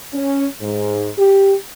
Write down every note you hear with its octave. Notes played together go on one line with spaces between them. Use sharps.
C#4
G#2
G4